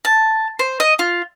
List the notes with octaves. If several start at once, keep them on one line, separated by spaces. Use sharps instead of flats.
A5
C5
D#5
F4